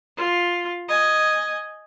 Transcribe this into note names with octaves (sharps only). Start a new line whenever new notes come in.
F4
D#5 G#5